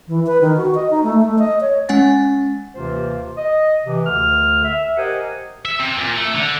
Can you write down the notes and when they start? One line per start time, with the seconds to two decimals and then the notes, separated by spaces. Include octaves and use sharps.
0.08 E3
0.26 B4
0.41 D#3
0.57 F#4
0.75 D#5
0.90 D#4
1.03 A3
1.21 A3
1.38 D#5
1.61 C#5
1.89 G#3 C#4 F#5 G#5 A6
2.75 D#2 C3 E3 F4 C5
3.37 D#5
3.86 C3 E3
4.05 D2 D3 F6
4.63 E5
4.97 G4 A#4 C5 D#5 F#5 G#5
5.65 E5
5.80 C3
5.98 A#2
6.16 A3
6.35 D3